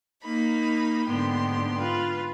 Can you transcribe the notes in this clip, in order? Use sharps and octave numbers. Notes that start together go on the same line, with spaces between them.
A#3 D#4 B5
G#2 D3 B3 G4 C6
F4 B4